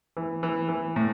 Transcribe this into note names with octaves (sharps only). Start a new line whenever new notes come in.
E3
E3
E3
A2